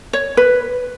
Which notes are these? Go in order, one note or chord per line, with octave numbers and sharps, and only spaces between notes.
C#5
B4